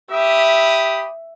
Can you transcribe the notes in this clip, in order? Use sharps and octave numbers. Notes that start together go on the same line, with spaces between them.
G4 E5 B5 D#6